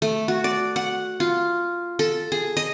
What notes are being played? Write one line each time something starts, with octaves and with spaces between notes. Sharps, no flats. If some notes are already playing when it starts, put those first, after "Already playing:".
A3
F#4
D5
F#5
F4
A4
G#4
D#5